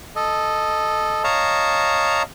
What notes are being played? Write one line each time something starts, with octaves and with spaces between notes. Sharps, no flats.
A4 D#5
C#5 D#5 F5 A5 A#5